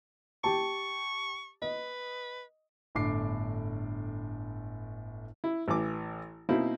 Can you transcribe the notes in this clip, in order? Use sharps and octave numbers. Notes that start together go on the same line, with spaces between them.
G4 A5 C#6
B4 D#5
G1 A2 D4 D6 C7
E4
A1 E3 D6
B2 A#3 C4 D#4 E4